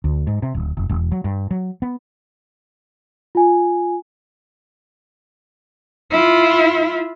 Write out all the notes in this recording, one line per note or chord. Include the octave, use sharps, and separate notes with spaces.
D2
G#2
C3
D1
F1
E1
F#3
G2
F#3
B3
F4 G#5
E4 F4